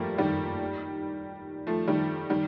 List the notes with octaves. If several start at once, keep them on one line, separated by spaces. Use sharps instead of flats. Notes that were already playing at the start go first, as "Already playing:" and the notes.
Already playing: F3 G3 A3 A#3
D#3 G3
F3 A3
D#3 G3
D#3 G3